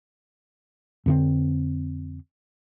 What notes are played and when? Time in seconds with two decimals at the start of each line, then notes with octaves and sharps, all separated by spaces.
1.06 F2 D3 C4